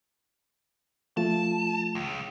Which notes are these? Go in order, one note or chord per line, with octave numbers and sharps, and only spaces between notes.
F3 A3 F4 A5
C#2